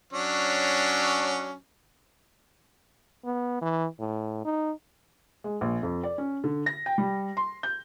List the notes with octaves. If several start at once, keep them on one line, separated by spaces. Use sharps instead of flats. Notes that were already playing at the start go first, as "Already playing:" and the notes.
F#3 C#4 D4
B3
E3
A2
D#4
G#3
A#1
F2
D5
C#4
D3
A#6
G5
G3
C6
G6